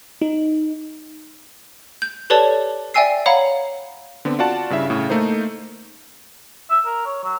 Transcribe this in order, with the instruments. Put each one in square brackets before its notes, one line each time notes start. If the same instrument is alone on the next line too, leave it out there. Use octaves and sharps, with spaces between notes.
[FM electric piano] D#4
[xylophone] G6
G4 A4 B4 C#5 D5 A5
D5 E5 G5 G#5 E6 C7
C#5 F5 F#5 A#5 B5
[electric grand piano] D3 B3 C4
F4 F#4 D5 F#5 A5
G2 C#3 E4 E5
A2 C#3
A3 A#3 D#4 C5
[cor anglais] E5
A#4
C#5
F#3